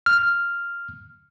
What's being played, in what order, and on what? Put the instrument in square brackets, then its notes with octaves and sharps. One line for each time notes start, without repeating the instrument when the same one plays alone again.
[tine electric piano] F6